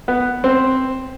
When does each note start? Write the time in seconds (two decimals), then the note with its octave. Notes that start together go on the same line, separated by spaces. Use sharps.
0.08 B3
0.44 C4